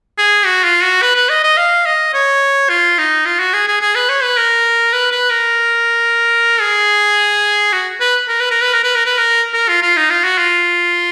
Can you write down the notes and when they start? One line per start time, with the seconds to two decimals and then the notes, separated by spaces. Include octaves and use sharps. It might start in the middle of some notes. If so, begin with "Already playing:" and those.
0.18 G#4
0.46 F#4
0.64 F4
0.83 F#4
1.02 B4
1.16 B4
1.30 D#5
1.44 D#5
1.58 F5
1.86 D#5
2.14 C#5
2.69 F4
2.98 D#4
3.26 F4
3.39 F#4
3.54 G#4
3.68 G#4
3.81 G#4
3.95 B4
4.09 C#5
4.23 B4
4.37 A#4
4.93 B4
5.12 B4
5.30 A#4
6.61 G#4
7.73 F#4
8.00 B4
8.28 A#4
8.40 B4
8.51 A#4
8.61 B4
8.73 A#4
8.84 B4
8.95 A#4
9.06 B4
9.18 A#4
9.54 A#4
9.69 F4
9.82 F4
9.97 D#4
10.10 F4
10.24 F#4
10.38 F4